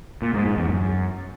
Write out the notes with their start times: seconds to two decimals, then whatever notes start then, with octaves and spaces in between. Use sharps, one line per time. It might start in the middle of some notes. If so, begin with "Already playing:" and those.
0.22 A#2
0.34 G#2
0.46 G#2
0.57 E2
0.69 F#2